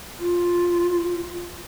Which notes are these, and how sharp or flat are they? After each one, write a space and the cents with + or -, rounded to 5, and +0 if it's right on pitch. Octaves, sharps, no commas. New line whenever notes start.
F4 +5